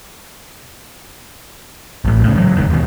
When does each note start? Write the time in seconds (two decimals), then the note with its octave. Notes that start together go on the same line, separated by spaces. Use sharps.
2.05 A#1 A2
2.24 A2 C#3
2.36 E3 F#3 G#3
2.56 F#1 E2 A2 D#3
2.70 D#2 B2